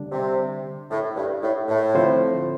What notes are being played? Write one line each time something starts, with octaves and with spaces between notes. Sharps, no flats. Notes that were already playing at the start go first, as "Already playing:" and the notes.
Already playing: D3 G3 D4
C3
A2
G2
A2
A2
D3 F3 C4 F4 C5